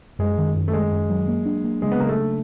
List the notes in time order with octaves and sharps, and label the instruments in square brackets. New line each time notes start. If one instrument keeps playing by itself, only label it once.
[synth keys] F#2 [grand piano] G#3
[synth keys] D#3
F#2
[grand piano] A3
[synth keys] D#3 [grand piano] G#3
[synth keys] F#2
F#3
A#3
D4
A#3
[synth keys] C#3 [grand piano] G#3
[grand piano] B3
[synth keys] C#3 [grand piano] A#3
[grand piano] A3
[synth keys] C#3